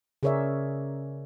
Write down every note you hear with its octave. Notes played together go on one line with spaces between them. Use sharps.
C#3 G#4 A#4 C#5 D5 E5